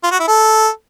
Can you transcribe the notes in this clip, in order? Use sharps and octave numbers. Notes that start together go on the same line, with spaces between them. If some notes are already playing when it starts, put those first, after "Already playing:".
F4
F#4
E4
A4